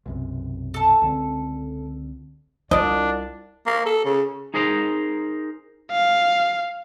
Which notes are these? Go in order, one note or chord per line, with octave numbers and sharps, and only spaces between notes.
B1 F#2 C3
A4 A5
C#2 D3 C4
C2 D4 F4 D5 D#5
A#3
A4
C#3
D#4 G#4 A#4 C5 E5 A#5
F5